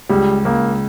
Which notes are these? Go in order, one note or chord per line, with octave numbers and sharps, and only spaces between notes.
C#2 G3
C#2 A#3